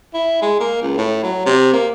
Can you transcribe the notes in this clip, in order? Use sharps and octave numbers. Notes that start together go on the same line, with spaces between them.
E4
G#3
A#3
C#2
A2
F#3
C3
A#3